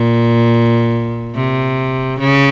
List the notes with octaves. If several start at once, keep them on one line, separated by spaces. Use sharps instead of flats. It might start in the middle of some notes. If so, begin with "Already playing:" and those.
Already playing: A#2
C3
C#3